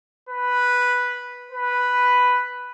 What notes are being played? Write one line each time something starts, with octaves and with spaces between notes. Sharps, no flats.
B4
B4